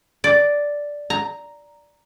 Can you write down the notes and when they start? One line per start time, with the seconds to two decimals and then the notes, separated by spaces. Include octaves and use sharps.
0.24 D5
1.10 A#5